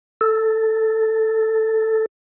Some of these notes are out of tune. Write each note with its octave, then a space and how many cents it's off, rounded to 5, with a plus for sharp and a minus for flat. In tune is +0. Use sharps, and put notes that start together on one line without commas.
A4 +5